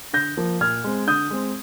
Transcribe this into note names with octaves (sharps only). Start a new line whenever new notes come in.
D3 G6 A#6
F3 A#3
A#2 F6 G#6
G#3 C4
D3 D#6 G6
G#3 C4